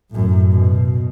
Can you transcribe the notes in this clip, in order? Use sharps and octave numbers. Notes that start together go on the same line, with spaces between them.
F#2 A2
B2